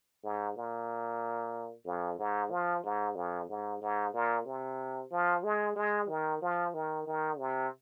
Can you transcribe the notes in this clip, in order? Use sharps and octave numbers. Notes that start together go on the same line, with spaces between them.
G#2
A#2
F2
G#2
F3
G#2
F2
G#2
G#2
A#2
C3
F3
G#3
G#3
D#3
F3
D#3
D#3
C3